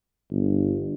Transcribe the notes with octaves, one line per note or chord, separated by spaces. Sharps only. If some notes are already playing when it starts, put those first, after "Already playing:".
G1